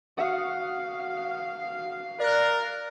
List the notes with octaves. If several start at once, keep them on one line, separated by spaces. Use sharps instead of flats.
F#4 F5 F#5 D#6
A#4 D5 F#6